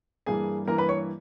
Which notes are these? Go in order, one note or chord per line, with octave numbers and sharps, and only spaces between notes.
G2 E3 A#3 G#4 G#5
G2 E3 A#3 A#4 A#5
B4 B5
C#5 C#6